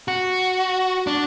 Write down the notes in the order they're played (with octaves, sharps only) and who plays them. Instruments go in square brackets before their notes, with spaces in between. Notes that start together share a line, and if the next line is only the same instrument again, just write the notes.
[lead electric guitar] F#4
D4